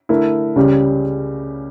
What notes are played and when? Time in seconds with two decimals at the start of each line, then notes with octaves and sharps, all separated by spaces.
0.09 D3 A3 E4 A#4
0.56 C#2 C#3 G3 C#4 G4